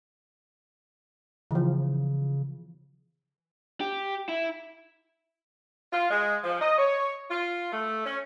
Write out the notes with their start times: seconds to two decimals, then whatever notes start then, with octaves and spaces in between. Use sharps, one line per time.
1.51 C#3 E3 F3
3.81 G4
4.29 E4
5.92 F4
6.10 G#3
6.44 F3
6.61 D#5
6.78 C#5
7.30 F4
7.72 A3
8.05 C#4